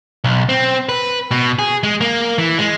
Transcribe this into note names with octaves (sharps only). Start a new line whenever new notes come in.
B1
C4
B4
B2
G#4
G#3
A#3
E3
G#3